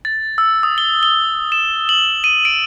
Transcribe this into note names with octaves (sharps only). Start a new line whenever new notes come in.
A6
E6
D#6
G7
G7
E7
F#7
D#7
D7